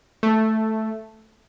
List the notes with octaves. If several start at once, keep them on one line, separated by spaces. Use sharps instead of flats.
A3